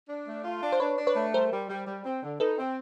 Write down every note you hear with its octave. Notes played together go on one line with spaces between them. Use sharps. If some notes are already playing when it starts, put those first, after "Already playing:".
D4
A3
F4
D4
C5
D4 B4 C#5
D4
B4 C#5
A3
G3 A#4 C5
G3
G3
G3
C4
D3
D#4 A4 B4
C4